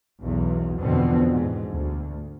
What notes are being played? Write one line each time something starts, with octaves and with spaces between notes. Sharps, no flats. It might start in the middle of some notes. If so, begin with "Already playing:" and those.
B1 E2
E2 B2 D3 F3 B3 C4
G#2
D2